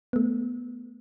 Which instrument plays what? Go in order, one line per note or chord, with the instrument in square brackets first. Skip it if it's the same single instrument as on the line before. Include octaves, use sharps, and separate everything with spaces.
[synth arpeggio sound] A3 B3